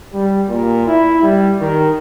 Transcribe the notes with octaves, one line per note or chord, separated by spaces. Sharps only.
G3
A#2
E4
G3
D#3